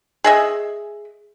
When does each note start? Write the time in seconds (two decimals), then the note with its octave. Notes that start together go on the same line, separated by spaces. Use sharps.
0.24 G#4 D#5 E5